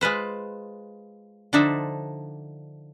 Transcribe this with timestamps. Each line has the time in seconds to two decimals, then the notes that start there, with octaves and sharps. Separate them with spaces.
0.01 G#3 F4 B4 C5
1.53 D3 F3 D4 D#4 C5 E5